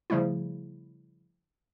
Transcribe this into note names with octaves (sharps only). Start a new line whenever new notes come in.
C#3 F3 G3 A3 E4